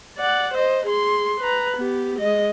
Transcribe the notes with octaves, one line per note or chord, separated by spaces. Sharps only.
D5 F#5
C5 D#5
G#4 C6
B4 A#5
B3 G4
G#3 D#5